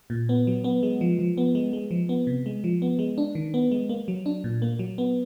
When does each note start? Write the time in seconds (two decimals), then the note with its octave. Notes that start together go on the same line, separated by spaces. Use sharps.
0.10 A#2
0.29 B3
0.47 F#3
0.64 B3
0.83 G#3
1.01 F3
1.19 F3
1.38 B3
1.55 G#3
1.73 G#3
1.91 F3
2.09 B3
2.27 C3
2.46 G#3
2.64 F3
2.82 B3
2.99 G#3
3.18 D4
3.35 D#3
3.54 B3
3.71 G#3
3.89 A#3
4.08 F#3
4.26 D4
4.44 A#2
4.62 A#3
4.79 F#3
4.98 B3